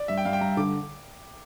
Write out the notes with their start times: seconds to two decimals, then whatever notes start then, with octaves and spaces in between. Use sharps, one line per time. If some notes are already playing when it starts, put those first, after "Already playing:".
Already playing: D5
0.08 G2 E5
0.18 G5
0.25 G2 F5
0.33 G5
0.41 G2 A#5
0.57 D3 D6